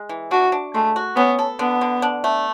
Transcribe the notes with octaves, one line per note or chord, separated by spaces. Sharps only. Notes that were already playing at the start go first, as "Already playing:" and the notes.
Already playing: G#3
E3
D4 F#4
D4
G#3 A3
F#4
B3 C#4
A4
D3 B3
D3
D4
A3